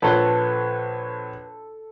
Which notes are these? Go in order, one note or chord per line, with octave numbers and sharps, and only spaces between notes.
A#1 A4 B4 C#5 C6